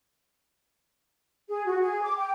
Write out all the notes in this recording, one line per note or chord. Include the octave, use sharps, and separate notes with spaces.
G#4
F#4
G#4
D6
G5